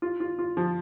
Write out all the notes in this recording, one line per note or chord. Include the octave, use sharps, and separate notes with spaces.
F4
F4
F4
F3